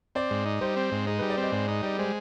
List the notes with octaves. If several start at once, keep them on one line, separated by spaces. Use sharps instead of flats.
C4 D5
G#2
D#4
G3 C5
C4
G#2
D#4 G#4
B4
G3
D5
C4 D#5
G#2 D5
D#4 D#5
G3 D5
G#3 C5